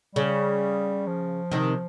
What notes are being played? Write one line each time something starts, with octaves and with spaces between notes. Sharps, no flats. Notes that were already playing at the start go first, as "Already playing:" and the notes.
C#3 G3
F3
C3 D#3